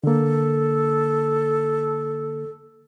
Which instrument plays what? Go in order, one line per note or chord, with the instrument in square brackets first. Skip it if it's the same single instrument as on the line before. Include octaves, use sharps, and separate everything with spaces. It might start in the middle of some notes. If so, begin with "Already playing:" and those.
[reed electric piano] D3 A#3 [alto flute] A4